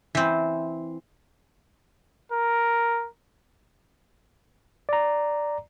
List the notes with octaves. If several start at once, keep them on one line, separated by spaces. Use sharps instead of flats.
E3 C4
A#4
D5 A#5